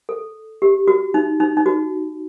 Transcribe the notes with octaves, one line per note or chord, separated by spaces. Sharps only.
A4
G4
F#4
D#4
D#4
D#4
F#4